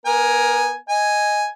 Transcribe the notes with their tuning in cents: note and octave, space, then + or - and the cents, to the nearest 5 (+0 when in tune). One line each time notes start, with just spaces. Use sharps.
B3 -15 A#4 +15 G#5 +0
D#5 +0 G#5 +0